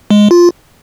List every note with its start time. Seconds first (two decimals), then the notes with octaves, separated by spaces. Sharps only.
0.10 G#3
0.31 F4